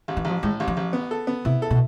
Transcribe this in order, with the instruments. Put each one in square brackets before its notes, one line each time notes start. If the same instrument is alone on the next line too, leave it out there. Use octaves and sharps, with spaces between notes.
[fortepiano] A1
[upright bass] E3
[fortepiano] A1 [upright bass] F3
[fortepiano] A2 [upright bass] G#3
[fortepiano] A1
[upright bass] F3
[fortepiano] A1
B3
A4
B3
[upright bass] C3 [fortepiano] E4
[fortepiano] A4
[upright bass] B2